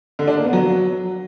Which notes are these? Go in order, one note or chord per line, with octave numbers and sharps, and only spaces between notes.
D3
D4
A#3
B3
F#3